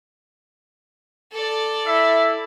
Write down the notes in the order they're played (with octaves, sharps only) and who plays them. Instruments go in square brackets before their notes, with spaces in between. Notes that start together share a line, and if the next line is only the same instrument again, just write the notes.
[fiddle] A4 D5
[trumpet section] E4 E5